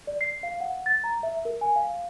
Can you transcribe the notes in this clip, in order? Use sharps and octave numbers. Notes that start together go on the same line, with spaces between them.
D5
C7
F5
F#5
A6
A#5
E5
A#4
G#5
F5